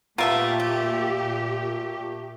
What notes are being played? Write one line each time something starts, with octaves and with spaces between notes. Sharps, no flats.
A#2 A3 B3 F4 G4 A#4 E5
A3